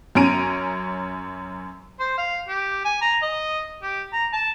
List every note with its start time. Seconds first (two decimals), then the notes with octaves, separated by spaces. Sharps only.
0.15 F#2 C#4 A#5 D7 D#7
2.00 C5
2.18 F5
2.48 G4
2.85 G#5
3.01 A#5
3.22 D#5
3.82 G4
4.13 A#5
4.33 A5